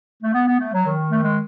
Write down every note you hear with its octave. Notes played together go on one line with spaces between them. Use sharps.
A3
B3
B3
A3
F#3
D#3
A3
G#3